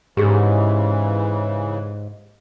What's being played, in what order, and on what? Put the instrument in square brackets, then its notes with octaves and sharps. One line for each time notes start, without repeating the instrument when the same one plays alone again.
[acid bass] G#2 [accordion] C#3 E3 [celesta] G4 G#4